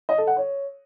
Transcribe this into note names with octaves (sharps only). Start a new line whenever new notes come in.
D#5
A4
F#5
C#5